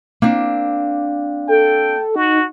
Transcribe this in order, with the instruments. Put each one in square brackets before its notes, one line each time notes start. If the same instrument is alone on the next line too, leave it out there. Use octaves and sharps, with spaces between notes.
[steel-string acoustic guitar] A#3 C4 D4
[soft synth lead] A4 [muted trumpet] G5
[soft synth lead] D#4 [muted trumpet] F#4